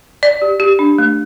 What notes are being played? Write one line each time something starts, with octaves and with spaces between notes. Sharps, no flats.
D5
G4
G4
D4
A3